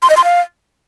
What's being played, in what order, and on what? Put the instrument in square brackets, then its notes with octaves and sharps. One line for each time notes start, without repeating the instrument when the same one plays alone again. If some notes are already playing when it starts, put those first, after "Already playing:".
[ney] C6
D#5
C6
F5